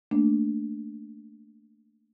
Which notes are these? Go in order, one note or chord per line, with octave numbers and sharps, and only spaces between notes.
A3 A#3 D4